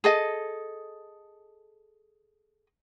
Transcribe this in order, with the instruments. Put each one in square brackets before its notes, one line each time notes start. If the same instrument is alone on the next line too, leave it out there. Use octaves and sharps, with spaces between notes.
[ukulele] G#4 A4 D#5